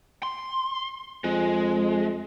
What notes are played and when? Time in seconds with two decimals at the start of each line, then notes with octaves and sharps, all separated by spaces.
0.23 C6
1.24 F2 G#3